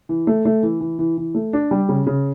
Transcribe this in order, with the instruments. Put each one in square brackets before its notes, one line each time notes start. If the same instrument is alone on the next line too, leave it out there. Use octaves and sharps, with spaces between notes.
[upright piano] E3
A3
A3
E3
E3
E3
E3
A3
D4
G3
C#3
C#3